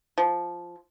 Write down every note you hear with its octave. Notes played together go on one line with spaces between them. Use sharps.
F3